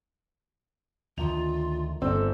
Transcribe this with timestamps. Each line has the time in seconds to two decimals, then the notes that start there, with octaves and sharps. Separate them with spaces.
1.18 D2 D#3 F4 F7
2.02 G1 C4 A4 E6